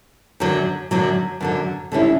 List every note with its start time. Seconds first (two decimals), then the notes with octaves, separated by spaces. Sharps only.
0.40 F#2 D3 F#3
0.91 F#2 D3 F#3
1.41 F#2 D3 F#3
1.92 D3 G3 C#4 E4